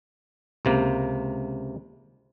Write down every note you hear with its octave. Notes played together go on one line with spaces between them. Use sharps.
C#2 C3 A#3